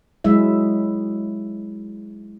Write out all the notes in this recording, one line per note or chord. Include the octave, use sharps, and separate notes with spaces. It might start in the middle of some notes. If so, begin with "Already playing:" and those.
F#3 G#3 E4 E5